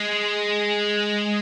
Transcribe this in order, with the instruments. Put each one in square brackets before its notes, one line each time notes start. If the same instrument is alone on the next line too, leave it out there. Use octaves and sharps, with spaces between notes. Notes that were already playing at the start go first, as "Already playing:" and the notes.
Already playing: [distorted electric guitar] G#3